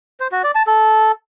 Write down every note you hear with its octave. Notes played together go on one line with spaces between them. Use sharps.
C5
F#4
D5
A5
A4